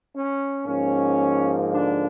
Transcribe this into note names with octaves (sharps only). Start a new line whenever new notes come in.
C#4
G#2 F3 A#3 C#4
D3 D4